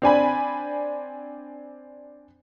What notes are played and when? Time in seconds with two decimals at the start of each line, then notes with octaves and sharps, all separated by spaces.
0.02 C4 D4 G#5 B5